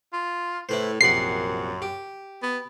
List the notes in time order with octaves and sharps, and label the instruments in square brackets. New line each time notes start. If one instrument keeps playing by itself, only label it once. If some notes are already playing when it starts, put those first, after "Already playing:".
[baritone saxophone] F4
[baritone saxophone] A2 [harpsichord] E4 B4 C5
[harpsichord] A#1 C3 F#5 [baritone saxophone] F#2 [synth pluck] C7
[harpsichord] G4
[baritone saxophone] B3